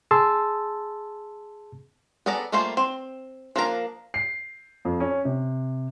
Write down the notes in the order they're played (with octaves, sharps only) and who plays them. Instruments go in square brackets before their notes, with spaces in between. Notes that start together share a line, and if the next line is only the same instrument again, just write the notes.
[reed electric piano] G#4 A5 C6 E6
[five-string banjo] B3 G#4 A4 D5 A#5
G3 A3 A#3 F4 C5
C4
F3 A#3 D4 A#4 A#5
[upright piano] C7
F2
C#4
C3